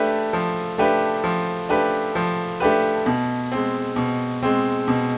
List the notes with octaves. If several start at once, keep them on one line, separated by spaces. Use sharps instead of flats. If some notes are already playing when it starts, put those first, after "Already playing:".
Already playing: A3 D4 G4 B4
F3
A3 D4 G4 B4
F3
A3 D4 G4 B4
F3
A3 D4 G4 B4
B2
G#3 C4
B2
G#3 C4
B2